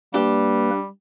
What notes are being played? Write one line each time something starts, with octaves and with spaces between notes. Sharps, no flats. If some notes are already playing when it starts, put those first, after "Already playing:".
G3 A#3 D4 G4 B4